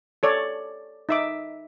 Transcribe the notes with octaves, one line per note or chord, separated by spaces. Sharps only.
A4 C#5 D5
D#4 E5 D6